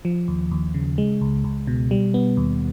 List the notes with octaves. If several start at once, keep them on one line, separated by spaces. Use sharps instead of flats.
F3
D#2
D#2
C#3
G#3
C#2
C#2
B2
G3
B3
D#2